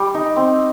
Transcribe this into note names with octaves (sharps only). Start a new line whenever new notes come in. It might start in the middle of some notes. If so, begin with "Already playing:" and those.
Already playing: G3
D#4
C4